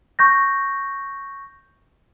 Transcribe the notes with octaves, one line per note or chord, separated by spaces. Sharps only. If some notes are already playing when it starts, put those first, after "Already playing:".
C#6 G6 A#6